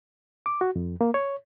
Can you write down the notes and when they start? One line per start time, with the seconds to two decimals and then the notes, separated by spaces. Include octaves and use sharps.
0.46 D6
0.61 F#4
0.76 F2
1.01 A#3
1.14 C#5